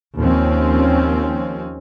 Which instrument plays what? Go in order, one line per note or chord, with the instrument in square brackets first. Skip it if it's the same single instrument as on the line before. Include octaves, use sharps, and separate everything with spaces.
[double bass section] D#2 F3 C4 C#4